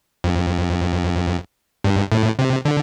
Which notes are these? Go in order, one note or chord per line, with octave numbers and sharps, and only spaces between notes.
F2
G2
A2
C3
D3